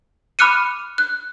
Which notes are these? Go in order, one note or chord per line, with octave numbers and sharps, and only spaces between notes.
B5 D6 F6 F#6 C#7 D#7
F#6